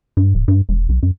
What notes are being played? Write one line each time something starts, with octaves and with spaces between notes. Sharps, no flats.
G2
D1
G2
E1
B1
F#2